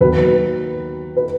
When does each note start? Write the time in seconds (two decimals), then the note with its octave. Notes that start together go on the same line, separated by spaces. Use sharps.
0.01 D#2 D#3 F#3 B3 F#4 B4
1.17 B4